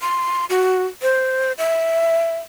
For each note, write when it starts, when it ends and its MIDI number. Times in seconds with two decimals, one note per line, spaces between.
0.01 0.45 84
0.50 0.86 66
1.02 1.53 72
1.58 2.36 76